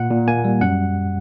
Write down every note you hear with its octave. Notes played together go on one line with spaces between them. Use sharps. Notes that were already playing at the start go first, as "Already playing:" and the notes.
Already playing: A#2 F#5
A#2
A#3 G#5
G3
F#2 F#5